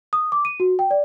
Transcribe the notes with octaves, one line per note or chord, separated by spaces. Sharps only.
D#6
D6
D#7
F#4
G5
D5